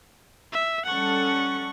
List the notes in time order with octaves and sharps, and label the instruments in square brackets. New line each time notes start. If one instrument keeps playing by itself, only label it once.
[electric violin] E5
[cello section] G3 C#4 A4 [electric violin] F#5 C#6